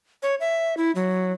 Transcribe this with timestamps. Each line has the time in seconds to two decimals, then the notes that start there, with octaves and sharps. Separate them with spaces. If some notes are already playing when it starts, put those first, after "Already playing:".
0.23 C#5
0.40 E5
0.77 E4
0.95 F#3